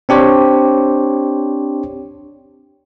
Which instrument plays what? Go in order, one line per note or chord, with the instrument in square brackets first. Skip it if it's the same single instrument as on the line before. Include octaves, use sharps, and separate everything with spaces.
[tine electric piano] C4 D4 G4 C5 C#5